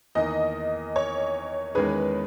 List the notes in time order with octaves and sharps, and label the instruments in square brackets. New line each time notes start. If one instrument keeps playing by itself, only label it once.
[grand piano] E2 D#3 A#3 [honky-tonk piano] D#5
[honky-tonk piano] C#5
[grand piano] E2 D#3 G#3 C#4 G#4 [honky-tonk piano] B4